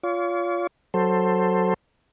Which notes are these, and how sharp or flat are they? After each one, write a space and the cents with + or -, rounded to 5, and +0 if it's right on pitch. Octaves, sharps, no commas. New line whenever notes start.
F4 +0 C#5 +45
F#3 +5 A4 +15 C5 +5